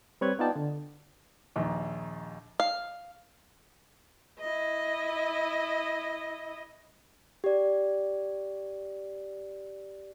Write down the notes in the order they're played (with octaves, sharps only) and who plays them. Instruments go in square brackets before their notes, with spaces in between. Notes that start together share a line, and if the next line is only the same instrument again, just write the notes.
[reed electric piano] G3 C4 B4 C#5 F#6 G#6
B3 D#4 F4 D5 G5 A5
D3
[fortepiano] A#1 D#2
[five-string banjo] F5
[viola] E4 D#5
[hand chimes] G4 D5